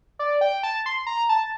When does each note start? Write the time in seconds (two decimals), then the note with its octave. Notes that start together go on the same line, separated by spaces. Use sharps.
0.19 D5
0.41 G5
0.63 A5
0.86 C6
1.06 A#5
1.29 A5